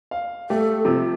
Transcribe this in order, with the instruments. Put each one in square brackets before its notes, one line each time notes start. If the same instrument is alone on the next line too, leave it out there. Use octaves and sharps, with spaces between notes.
[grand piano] F5
[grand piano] A3 G4 [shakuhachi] A4
[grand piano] C3 F3